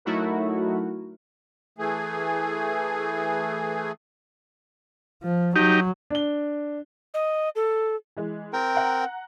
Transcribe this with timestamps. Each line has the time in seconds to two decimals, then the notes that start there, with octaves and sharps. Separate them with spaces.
0.05 F#3 A3 D#4 E4 F#4 A#4
1.78 E3 A3 G#4
5.23 F3
5.56 F#3 D#4 G4
6.10 D4 G7
7.14 D#5
7.56 A4
8.17 E3 G#3
8.53 C4 A#4 G5
8.75 F#5 A#5